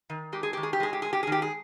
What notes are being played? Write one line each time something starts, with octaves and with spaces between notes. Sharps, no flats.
D#3
G#3 G4
G#4
D#3 G4
G#4
G4
G#3 G#4
G4
G#3 G#4
G4
G#4
D#3
G4
G#4